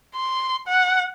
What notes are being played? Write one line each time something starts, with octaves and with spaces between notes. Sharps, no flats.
C6
F#5